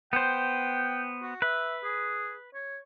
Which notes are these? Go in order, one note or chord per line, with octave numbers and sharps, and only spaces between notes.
B3 C5 G5
F#4
B4 E5
G#4
C#5